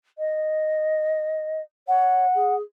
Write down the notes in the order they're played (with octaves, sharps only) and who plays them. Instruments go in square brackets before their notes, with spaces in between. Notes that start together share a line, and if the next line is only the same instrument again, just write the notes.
[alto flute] D#5
[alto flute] C#5 [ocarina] F#5
[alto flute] G#4